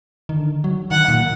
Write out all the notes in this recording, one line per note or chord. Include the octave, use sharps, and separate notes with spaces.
D#3
D3
F#3
D#3 F#5
A#2